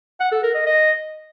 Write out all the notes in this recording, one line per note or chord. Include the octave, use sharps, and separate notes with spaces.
F#5
A4
A#4
D#5
D#5